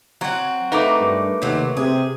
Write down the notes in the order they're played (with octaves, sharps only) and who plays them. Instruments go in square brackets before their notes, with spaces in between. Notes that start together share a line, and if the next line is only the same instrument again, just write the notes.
[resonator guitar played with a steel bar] F#3 [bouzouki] C4 F#4
[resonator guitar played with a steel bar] A3 A#3 D#4 [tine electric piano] B4 D6
[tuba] G2
[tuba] D#2 [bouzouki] C3 F#3
[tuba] C3 [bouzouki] G#4